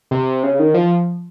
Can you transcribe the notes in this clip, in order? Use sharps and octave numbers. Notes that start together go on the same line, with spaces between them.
C3
C#3
D#3
F3